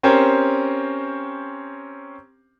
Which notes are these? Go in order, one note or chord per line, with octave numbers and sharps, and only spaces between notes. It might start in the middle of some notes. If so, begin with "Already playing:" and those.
C4 C#4 G4 A#4 C5